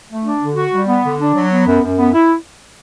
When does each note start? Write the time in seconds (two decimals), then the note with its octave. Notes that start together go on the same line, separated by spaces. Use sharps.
0.09 A3
0.24 D4
0.41 D3
0.55 F#4
0.72 G3
0.87 B3
1.03 D3
1.19 D4
1.35 F#3
1.51 B3
1.66 F#2
1.82 F#2
1.98 B3
2.13 E4